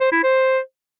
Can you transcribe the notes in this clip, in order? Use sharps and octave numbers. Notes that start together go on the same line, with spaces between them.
C5
E4
C5